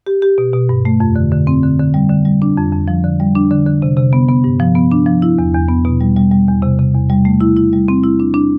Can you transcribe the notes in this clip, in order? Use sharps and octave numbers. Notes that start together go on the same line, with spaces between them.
G4
G4
B2
B2
G2
A3
F2
D3
D3
C4
D3
D3
G3
D3
G3
D4
F2
F2
F3
D3
G3
D4
D3
D3
C3
C3
B3
B3
G2
F3
B3
D4
F3
E4
E2
E2
B3
B2
G3
G3
G3
E2
C3
C3
E2
G3
A3
E4
E4
G3
C4
E4
D4
D4